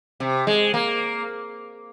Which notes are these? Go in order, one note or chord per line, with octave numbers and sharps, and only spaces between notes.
C3
G#3
A#3